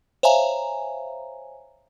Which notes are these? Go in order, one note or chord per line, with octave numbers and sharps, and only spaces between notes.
C5 C#5 E5 F5 G#5 A#5